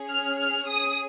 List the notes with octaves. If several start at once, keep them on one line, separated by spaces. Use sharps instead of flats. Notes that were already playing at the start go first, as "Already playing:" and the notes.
Already playing: C#4 G#4
F6
F6
D#6